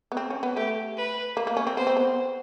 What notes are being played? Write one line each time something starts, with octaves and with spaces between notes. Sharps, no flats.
B3
C4
C#4
B3
A3 G4
B4
A#3
A#3
C#4
C4
B3 C5
C4
B3